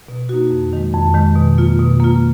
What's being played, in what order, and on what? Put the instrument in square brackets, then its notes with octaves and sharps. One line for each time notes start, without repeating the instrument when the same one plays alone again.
[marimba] B2
A#3 D#4 F#4
F2
D#3 G#3
F2
D#3 G#3
B2
A#3 F4
B2
A#3 F4